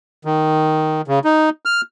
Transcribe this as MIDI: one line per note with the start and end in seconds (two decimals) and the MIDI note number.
0.25 1.01 51
1.08 1.19 49
1.24 1.50 63
1.65 1.81 89